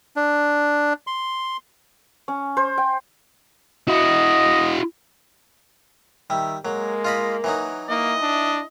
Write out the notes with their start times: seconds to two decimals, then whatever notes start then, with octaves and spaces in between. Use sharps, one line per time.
0.16 D4
1.07 C6
2.28 C#4
2.57 C5
2.78 G5
3.88 E4 F#4 D#5
6.30 D#3 G3 E5
6.65 F#3 G#3 A#3
7.05 F4 D#5 B5
7.44 E3 F#3 D#4
7.89 A#3 E4 D#5
8.22 D4